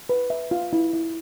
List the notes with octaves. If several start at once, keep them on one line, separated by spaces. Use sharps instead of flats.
B4
E5
F4
E4
E4